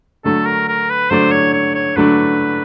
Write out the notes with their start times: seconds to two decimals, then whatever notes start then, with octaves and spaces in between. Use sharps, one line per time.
0.24 D3 F#3 A3 D4 A4
0.46 A#4
0.68 A#4
0.90 B4
1.10 D3 F#3 A3 D4 C5
1.32 C#5
1.53 C#5
1.75 C#5
1.96 D3 F#3 A3 D4 B4